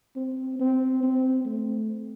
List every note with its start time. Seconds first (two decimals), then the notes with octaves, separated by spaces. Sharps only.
0.16 C4
0.60 C4
1.03 C4
1.45 A3